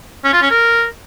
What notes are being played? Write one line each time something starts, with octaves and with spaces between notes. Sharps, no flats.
C#4
F4
C#4
A#4